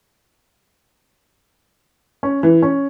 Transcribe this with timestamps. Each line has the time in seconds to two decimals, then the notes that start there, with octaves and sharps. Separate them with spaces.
2.23 C#4
2.43 E3
2.62 C#4